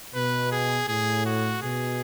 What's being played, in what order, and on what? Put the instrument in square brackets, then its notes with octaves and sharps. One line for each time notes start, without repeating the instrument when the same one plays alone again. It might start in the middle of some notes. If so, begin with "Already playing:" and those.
[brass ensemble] B2 [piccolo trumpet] B4
[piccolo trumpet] G#4
[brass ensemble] A2 [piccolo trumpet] G#4
[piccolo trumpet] F#4
[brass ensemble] B2 [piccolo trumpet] G#4